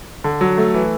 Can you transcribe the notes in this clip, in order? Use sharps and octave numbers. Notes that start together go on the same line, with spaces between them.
D3
F#3
A3
E3